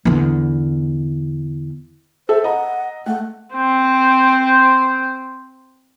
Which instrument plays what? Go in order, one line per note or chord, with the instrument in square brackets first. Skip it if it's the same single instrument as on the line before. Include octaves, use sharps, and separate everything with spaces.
[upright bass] E2 D3
[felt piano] A4 E5 [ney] C5
[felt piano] D#5 A#5 [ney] F#5
[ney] A3 [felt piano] F#5
[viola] C4 C5